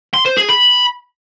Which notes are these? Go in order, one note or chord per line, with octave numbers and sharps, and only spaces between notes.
C6
C5
G#4
B5